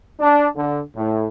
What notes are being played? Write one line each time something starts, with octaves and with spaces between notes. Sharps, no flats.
D4
D3
A2